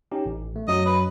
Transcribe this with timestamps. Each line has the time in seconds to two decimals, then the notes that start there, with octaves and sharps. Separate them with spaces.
0.12 C#4 D#4 G4
0.26 A1
0.56 A3
0.68 F#2 F#3 D#5
0.86 B4